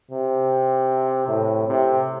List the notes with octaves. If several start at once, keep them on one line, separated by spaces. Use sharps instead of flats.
C3
A2
C3